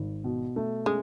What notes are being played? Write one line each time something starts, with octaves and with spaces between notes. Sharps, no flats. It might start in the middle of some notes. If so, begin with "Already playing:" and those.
Already playing: G#1
B2
A3
G#3 C#4